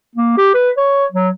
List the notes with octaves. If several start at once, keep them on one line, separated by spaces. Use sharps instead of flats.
A#3
G4
B4
C#5
F#3